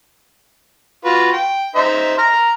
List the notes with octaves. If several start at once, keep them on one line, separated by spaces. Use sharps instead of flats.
F4 F#4 B4
G5
D#4 C5 E5
A#5 F6